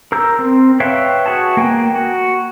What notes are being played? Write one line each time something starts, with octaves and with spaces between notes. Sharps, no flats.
A#4 A#5 E6 G6
C4
B4 C#5 E5 F5 G5
F#4 G#4 A5
A#3 G5 G#5
F#4